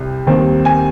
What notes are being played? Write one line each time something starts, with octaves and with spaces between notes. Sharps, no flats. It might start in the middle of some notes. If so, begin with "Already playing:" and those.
Already playing: C2 C3
D#2 D#3 G3 C4
G#5